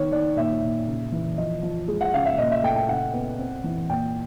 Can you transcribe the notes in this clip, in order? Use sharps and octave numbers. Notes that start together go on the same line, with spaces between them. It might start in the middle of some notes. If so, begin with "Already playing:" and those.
Already playing: D#3 B3 C#5
D#3 D5
A#2 E5
A#2
C#3
E3
F3 D#5
F3
G#3
F#5
C#3 F5
E5
A#2 D#5
E5
A3 G5
G5
C#3 F#5
B3
C4
E3
A#2 G5